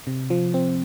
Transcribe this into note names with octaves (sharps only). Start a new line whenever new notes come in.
C3
F3
C4